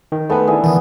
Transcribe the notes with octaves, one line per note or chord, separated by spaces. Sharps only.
D#3
G#3 A3 B3 A4 B4
D4 E4 G#4
D#3 E3 B3